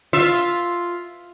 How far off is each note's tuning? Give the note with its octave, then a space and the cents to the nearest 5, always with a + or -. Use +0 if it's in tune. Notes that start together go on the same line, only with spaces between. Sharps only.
F4 +0 E5 +0